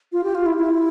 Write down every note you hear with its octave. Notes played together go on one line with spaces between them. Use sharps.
F4
G4
F4
E4
E4